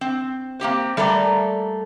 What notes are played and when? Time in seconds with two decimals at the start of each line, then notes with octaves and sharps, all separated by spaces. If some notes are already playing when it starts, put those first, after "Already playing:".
0.01 C4
0.60 A#3 C4 G4 C5
0.97 G3 A3 A#3 D5 A#5